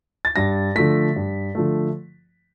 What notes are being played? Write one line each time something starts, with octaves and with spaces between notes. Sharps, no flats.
A6
G2 A#6
D3 F3 A3 B6
G2
D3 F3 A3